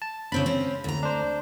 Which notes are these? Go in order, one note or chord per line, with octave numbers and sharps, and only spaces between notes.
A5
C#3 C4 D4 B5
C4 C#4
D2 A#5
D4 C5